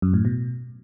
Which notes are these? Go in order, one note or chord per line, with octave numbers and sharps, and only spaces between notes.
F#2
A2
B2